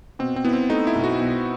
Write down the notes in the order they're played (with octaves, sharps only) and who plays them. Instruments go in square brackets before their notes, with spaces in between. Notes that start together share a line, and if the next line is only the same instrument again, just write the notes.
[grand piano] B2 [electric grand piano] C4
[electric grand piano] C4
[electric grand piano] B3 [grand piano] E4
[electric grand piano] C4
[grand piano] A3 [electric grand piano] D#4
[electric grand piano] E4
[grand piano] B1
[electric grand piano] F#4
[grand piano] B2